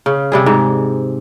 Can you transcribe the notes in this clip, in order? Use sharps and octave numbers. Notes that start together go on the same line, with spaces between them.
C#3
C3 G3 G#4
G#2